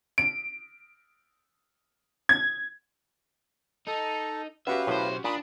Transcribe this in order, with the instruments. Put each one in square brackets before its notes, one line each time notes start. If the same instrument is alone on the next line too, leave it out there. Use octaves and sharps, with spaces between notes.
[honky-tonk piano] D7
G#6
[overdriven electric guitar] D#4 [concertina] A4
[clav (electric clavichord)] B3 [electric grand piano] C#4 F#4 G4 [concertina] B4 F5 [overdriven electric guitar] E5
[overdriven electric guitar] B1 C5 [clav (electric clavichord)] A2
[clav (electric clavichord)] A#2 [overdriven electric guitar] D4 [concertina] B5 D#6